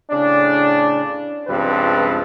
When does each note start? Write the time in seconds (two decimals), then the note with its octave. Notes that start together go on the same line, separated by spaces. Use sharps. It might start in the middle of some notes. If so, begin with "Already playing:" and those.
0.11 A2 C#3 D4
1.47 C#2 G2 F3 C4 B4